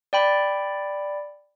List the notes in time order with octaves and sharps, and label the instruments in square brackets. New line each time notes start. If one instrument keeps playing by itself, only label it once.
[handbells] D5 G5 B5